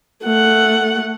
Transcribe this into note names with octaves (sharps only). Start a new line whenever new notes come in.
A3 F#5